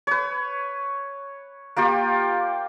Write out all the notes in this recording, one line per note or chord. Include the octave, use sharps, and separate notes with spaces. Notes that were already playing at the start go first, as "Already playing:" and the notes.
B4 C#5
A#3 F4 G4 G5